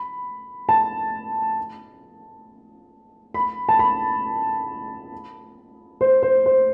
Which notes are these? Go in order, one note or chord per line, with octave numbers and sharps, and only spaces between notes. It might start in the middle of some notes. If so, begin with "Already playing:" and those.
Already playing: B5
A5
B5
A5
B5
C5
C5
C5